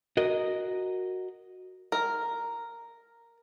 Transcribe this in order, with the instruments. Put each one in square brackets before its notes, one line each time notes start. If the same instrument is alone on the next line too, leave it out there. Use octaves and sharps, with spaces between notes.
[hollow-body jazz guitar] F#4 A#4 D#5
[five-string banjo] A#4